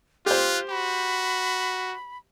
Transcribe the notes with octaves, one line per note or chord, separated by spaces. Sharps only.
F4 G4 C5 F#6
F#4 B5